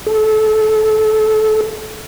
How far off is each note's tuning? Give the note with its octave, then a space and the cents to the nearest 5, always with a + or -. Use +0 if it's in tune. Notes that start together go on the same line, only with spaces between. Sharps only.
A4 -25